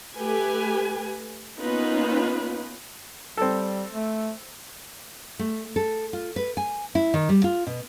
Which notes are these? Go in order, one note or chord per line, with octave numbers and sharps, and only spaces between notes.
A3 G4 B4 G#5
A#3 B3 C#4 D#4 F4 B4
G3 C4 A4
A3
A3
A4
F4
B4
G#5
E4
D#3
G3
F4
B2